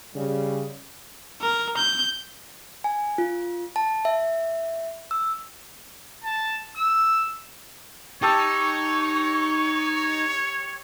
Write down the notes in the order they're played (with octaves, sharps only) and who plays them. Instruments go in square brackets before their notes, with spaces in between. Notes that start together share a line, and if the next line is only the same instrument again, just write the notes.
[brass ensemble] C#3 G3
[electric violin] A#4
G6
[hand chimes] G#5
F4
A5
E5
E6
[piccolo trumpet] A5
E6
[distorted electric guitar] D#4 [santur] G4 A5 E6 [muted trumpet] C#5 [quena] C#6